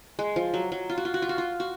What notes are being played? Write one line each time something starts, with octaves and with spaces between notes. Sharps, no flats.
G#3
F3
F#3
F#3
F4
F#4
F4
F#4
F4
F#4
F4
F#4